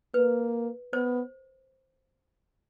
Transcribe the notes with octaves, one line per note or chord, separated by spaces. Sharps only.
A#3 B4
B3 C5